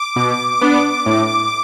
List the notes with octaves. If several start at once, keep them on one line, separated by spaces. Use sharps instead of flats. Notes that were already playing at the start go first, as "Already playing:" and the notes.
Already playing: D6
B2
B3 D4
A2